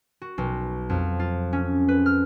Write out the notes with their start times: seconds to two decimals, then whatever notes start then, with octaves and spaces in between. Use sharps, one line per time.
0.22 F#4
0.38 B1
0.90 F2
1.20 F4
1.53 C#4
1.88 B4
2.06 F6